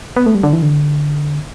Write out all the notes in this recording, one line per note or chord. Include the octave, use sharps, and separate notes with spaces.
B3
A3
G3
D3
E3
D3